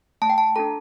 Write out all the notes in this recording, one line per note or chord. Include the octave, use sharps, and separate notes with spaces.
A3 A5
G5
A5
D4 F4 A4 A#5